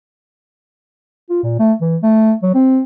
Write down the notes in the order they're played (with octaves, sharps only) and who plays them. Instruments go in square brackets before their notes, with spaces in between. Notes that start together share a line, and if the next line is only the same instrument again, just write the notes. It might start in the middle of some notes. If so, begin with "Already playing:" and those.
[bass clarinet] F4
A#2
A3
E3
A3
F#3
C4